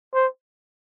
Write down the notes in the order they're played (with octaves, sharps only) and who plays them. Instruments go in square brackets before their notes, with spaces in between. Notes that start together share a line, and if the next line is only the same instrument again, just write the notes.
[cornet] C5